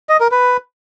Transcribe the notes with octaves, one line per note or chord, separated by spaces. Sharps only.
D#5
A#4
B4